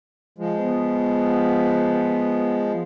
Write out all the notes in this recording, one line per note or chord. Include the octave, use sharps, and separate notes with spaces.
F3 G#3
B3